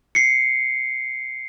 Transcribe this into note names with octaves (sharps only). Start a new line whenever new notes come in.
C7 C#7